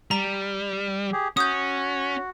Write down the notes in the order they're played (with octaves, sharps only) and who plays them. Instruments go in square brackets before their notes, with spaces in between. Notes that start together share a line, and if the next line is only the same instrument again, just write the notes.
[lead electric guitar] G3 [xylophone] A#5
[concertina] G4 G#4
[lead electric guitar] C#4 [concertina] F#4 [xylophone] D#6 G6